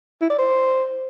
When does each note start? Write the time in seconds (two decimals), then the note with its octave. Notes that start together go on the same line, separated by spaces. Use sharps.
0.21 E4
0.30 D5
0.38 C5